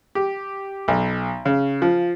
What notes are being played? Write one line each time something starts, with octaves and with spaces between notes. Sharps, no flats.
G4
B1
C#3
F3